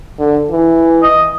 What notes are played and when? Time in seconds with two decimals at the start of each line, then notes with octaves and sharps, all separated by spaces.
0.19 D3
0.50 E3
1.03 D#5